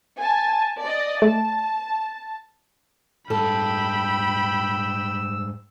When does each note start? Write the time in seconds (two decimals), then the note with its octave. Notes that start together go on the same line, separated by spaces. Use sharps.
0.18 G#5 A5
0.83 D5 D#5
1.22 A3 A5
3.30 G#2 G3 A4 G5 B5 E6